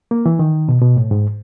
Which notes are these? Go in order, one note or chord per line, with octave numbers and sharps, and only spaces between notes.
A#3
E3
D#3
B2
B2
A2
G#2